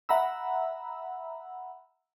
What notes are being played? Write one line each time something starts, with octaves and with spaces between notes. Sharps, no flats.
E5 F#5 A#5 B5 E6